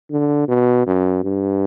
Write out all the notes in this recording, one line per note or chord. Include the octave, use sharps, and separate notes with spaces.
D3
B2
F#2
G2